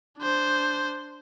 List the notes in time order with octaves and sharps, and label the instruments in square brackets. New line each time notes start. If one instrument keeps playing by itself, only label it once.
[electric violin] D4 C5